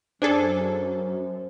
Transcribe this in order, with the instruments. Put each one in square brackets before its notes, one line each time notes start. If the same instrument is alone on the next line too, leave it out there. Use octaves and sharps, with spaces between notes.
[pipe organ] F#2 [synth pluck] D4 G#4 A4 [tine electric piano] C5